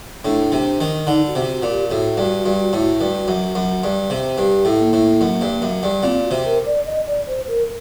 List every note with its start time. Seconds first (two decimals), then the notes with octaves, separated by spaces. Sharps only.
0.25 A2 D4
0.52 C3
0.81 D#3
1.07 D3 D#4
1.28 F#4
1.35 C3
1.49 F#4
1.63 A#2
1.70 G4
1.90 A2 F#4
2.17 G2
2.46 G2
2.73 A2
3.01 G2
3.28 F#2
3.55 F#2
3.84 G2
4.10 C3
4.38 G2 G4
4.65 A2
4.79 A#3
4.93 A2
5.21 F#2
5.41 G2
5.62 F#2
5.83 G2
6.03 A#2 C4
6.24 F#4
6.31 C3
6.45 A#4
6.66 D5
6.86 D#5
7.07 D5
7.27 C5
7.48 A#4